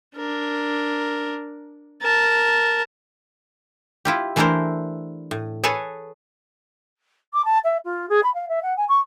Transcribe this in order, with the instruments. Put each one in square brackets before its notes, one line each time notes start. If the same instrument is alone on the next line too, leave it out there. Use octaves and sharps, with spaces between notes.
[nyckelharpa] D4 A#4
A#4 A5
[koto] E4 F4 G4
E3 A3 D4 E4 A#4 C5
A2
G#4 A4 B4 C#5 G#5 A5
[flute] D6
A5
E5
F4
G#4
B5
F5
E5
F#5
G#5
C#6